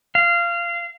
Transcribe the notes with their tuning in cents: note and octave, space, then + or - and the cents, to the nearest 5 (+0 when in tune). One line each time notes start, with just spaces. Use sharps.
F5 -20